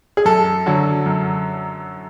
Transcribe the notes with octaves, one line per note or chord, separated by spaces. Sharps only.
G#4
F#2 A4
D3 F#3
F#2